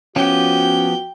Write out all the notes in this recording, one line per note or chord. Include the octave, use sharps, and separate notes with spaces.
F3 B3 C#4 F#4 G4 G5